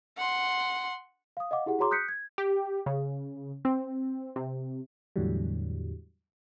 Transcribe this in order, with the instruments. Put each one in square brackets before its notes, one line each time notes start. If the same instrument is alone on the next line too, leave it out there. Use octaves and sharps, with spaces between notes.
[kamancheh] F#5 C6
[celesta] F5 D#6
D#5 F5 F#5 D6
E4 G4 G#4 F#5
F#4 G#4 C#5 A#5 C6 D6
D#6 F#6 G6 B6 C#7
G#6
[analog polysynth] G4
C#3
C4
C3
[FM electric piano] E2 A2 D3 E3 F#3 G3